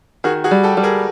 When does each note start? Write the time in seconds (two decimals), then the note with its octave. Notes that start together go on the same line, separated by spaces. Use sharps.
0.24 D#3 F#4 G#4
0.44 F#4 G#4
0.51 G3
0.63 G4 A4
0.77 G3
0.83 G#4 A#4